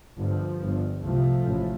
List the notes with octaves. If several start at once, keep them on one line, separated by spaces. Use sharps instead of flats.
G1 G2 F3
G1 G2
C2 C3 F3 A3
A1 A2